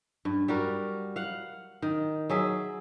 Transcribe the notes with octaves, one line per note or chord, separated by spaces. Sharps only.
G2
G3 F#4 A#4
F5 F#5
D#3
F#3 G#4 E5